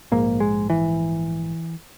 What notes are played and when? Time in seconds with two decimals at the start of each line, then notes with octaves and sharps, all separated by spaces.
0.12 A#1 G#2 A#3
0.40 G#3
0.70 E3